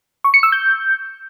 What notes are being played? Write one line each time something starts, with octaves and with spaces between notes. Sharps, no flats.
C#6
C#7
E6
G6